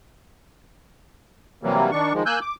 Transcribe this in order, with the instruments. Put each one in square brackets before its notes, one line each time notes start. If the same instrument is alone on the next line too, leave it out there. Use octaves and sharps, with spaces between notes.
[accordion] C3 E3 F#3 G3 A#3
D#3 D4 C#6
D#3 F3 G#3
A#3 G#5 E6 F#6 G6
D6